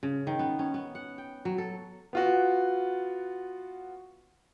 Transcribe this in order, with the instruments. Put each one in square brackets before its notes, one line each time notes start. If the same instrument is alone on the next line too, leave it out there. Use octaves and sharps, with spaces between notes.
[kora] C#3
D#3
B3
C#4
B3
F#5
G5
F#3
A4
[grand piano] B3 F4 F#4